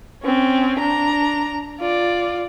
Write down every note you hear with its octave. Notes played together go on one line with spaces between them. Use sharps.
C4 C#4
D4 A#5
F4 D5